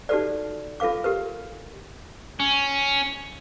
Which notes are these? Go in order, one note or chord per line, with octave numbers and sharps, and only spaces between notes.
D#4 F#4 G4 A4 B4 D5
F4 A4 B4 F5 D6
G4 A#4 B4
C#4